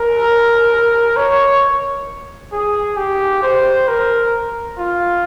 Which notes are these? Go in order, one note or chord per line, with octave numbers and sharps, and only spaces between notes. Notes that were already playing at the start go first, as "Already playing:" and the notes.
Already playing: A#4
C#5
G#4
G4
C5
A#4
F4